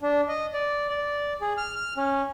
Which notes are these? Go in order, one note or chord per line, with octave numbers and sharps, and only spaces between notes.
D4
D#5
D5
D5
G#4
F6
F6
C#4